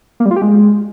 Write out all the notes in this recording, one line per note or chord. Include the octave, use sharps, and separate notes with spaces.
A#3
G3
F4
G4
G#3